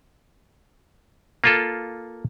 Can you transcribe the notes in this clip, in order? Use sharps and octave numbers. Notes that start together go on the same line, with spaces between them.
A#3 F4 A4